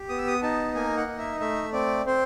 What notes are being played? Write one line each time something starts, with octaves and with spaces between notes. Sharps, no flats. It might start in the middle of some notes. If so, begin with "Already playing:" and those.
Already playing: G4
B3 D#6
E6
D#6
D#4 A5
A#3 G#5
F#5
D#4
E5
A3 E5
C4 D5
C4 C5